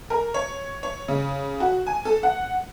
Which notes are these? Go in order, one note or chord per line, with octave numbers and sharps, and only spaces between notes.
A#4
C#5
C#5
C#3
F#4
G#5
A4
F#5